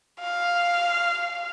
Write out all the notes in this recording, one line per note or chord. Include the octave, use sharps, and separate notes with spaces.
F5